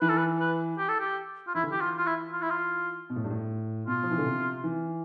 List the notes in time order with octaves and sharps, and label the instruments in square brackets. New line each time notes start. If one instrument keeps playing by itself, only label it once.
[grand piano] E3 [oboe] B4
[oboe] A4
B4
B4
G4
A4
G4
F4
[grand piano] E3 [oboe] E4
[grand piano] D3
[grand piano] E3 [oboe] G4
[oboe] F4
F4
E4
F4
E4
F4
[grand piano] B2
A2
G2
A2
[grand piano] B2 [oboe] F4
[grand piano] F3
E3
D3
C3
E3